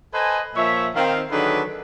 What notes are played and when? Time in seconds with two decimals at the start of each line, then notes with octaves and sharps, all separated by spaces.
0.13 A4 B4 C5 D#5 G#5
0.56 A#2 F3 C#5 E5
0.95 D#3 C4 F5
1.31 D3 D#3 F#3 D4 G#4 B4